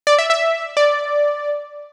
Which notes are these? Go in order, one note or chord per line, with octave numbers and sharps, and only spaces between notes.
D5
E5
E5
D5